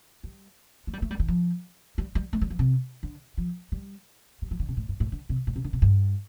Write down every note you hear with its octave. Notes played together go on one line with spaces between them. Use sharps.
G3
A3
G3
A3
G3
D3
F3
G3
G3
A3
G3
F3
C3
D3
F3
G3
G3
F3
D3
C3
A2
G2
A2
D3
C3
A2
C3
D3
C3
G2